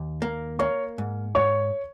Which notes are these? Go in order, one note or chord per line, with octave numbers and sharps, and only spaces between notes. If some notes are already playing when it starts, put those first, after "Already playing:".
Already playing: D#2
A#3
A#3 C#5 C#6
G#2
G#2 C#5 C#6